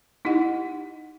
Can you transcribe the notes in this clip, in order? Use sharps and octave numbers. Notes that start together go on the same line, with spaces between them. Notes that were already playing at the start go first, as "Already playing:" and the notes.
D#4 E4 G4 D#5 F#5